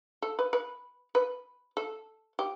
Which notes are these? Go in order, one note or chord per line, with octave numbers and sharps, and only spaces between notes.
A4
B4
B4
B4
A4
G4